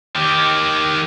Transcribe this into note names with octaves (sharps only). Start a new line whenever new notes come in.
D#3 G4